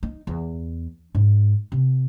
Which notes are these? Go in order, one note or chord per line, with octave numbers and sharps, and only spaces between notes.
D#4
E2
G#2
C3